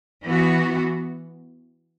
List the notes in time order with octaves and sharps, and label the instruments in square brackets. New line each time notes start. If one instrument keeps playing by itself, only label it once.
[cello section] E3 B3 F#4